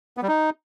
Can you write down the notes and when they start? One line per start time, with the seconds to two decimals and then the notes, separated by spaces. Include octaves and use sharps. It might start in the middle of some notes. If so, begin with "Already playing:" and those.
0.17 B3
0.23 G3
0.28 D#4